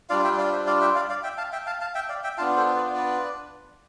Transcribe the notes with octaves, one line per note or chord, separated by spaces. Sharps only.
G3 D4 F4 D5 F5
E5 G5
D5 F5
C5 E5
D5 F5
E5 G5
D5 F5
D5 F5
E5 G5
F5 A5
E5 G5
F5 A5
F5 A5
E5 G5
D5 F5
E5 G5
B3 D4 F4 F5 A5
A4 C5
B4 D5
B4 D5